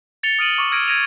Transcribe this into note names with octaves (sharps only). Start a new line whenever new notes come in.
A6 C#7 F7 G7
D#6 F6 D7 D#7 F#7
C#6 D6
E6 F6 G#6 A#6 D7 D#7
G#6 A#6 D7 D#7 F7